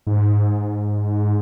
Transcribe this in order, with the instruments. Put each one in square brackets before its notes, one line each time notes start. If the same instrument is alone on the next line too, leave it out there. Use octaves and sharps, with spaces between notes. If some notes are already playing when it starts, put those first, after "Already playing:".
[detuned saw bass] G#2